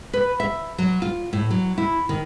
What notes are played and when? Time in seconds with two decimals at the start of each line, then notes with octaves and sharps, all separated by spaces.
0.13 B4
0.40 E5
0.78 F#3
1.02 F4
1.33 A2
1.51 F#3
1.78 E4
2.09 D#3